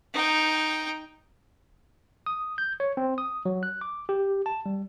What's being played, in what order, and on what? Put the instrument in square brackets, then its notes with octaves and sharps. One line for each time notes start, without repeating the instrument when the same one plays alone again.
[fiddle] D#4 G5
[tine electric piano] D#6
G6
C#5
C4
D#6
F#3
F#6
D6
G4
A5
G3